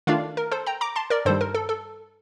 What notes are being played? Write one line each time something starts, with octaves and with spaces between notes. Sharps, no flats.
D#3 A3 D4 F4 D5 F5
A#4
A4 C5
G5 A#5
A#5 D6
A5 C6
A#4 D5
G2 D#3 G3 A4 C5
A#4
A4
A4